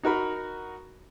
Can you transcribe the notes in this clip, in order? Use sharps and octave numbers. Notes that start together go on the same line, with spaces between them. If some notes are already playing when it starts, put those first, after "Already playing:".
D#4 F#4 A#4 B5